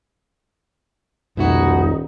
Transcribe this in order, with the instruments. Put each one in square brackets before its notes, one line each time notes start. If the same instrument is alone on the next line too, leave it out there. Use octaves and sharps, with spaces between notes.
[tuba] D#1 [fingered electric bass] C2 F2 G#2 [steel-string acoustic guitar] B2 E4 F#4 [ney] D#4